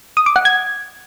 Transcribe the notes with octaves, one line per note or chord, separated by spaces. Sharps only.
D#6
D6
F#5
G#6